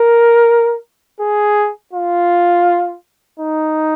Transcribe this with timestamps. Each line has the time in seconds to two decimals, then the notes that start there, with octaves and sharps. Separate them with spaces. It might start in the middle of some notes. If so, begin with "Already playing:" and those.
Already playing: A#4
1.20 G#4
1.93 F4
3.39 D#4